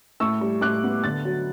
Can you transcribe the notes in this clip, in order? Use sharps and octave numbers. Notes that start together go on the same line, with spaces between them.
A2 C#6 E6
G3
A2 D6 F#6
B3
D3 F#6 A6
F#3